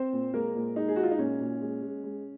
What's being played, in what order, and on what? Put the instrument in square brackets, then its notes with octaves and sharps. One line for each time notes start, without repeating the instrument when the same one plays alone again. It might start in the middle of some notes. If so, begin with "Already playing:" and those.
Already playing: [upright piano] C4 C5
A#2
G#3 A#3 A#4
A#2
G#3 D#4
G#4
G#3 F#4
F4
D#4
A#2 C#4
A#2
G#3
G#3
G#3